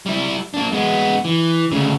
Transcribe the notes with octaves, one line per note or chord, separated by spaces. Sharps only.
G3 E4
A#3 D4
G#3 B3
E3
D2 C#3